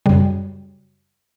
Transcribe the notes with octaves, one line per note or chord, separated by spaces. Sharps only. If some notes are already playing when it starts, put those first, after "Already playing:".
F#2 C#3 G3